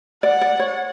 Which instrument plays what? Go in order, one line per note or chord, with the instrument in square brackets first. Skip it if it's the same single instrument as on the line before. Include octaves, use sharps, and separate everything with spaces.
[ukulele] D5 [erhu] F#5
[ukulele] D5
C#5